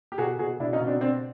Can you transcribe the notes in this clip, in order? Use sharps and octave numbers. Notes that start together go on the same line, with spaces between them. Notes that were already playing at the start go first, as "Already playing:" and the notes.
G4
B2 F#4 G#4
B2 F#4 G#4
B2 D4 E4
C#4 D#4
B2
C4 D4
B2 C4 D4